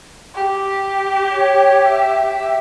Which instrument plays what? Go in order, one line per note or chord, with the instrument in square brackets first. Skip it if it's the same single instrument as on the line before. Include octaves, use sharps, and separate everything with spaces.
[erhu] G4
[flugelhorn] C#5
E5